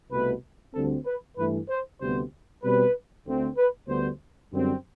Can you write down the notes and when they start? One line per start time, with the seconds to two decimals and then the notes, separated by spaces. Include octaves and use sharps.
0.10 C2 B2 A3 B4
0.73 D2 D3 G3 C4 A4
1.05 B4
1.37 G2 E3 A3 B4
1.68 C5
1.99 D2 C3 G3 B3 C5
2.62 B2 G3 C4 B4
3.25 D2 D3 A3 C4
3.56 B4
3.88 D2 D3 G3 B3 C5
4.51 F#2 D3 G3 C4